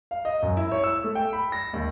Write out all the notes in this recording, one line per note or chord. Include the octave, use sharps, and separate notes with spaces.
F5
D#5
F#2
E4
C#5
E6
A3
G5
B5
A#6
D#2